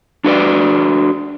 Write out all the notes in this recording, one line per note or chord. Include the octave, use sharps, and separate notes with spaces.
D4 F#4 B4 D5